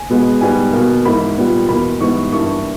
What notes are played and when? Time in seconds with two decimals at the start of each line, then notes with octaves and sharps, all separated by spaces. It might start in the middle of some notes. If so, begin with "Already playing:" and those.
Already playing: G#5
0.10 B2 G#3 B3
0.41 G#2 G3 B3 G#5
0.73 B2 A#3
1.05 G#2 E3 A#3 B5
1.37 A#2 G3 B3
1.69 E2 B2 A#3 B5
2.00 G#2 E3 G3 B3 C#6
2.32 G2 E3 A#3 C#6